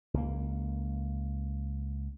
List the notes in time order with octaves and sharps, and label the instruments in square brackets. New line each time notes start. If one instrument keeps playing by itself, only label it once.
[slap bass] C#2 A#3